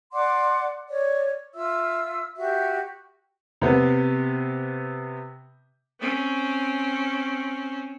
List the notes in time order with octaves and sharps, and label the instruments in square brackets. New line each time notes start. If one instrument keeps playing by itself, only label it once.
[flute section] D5 F#5 C6 D6
C#5 D5
F4 E5 E6
F#4 G4 E5
[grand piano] C3 B3
[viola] C4 C#4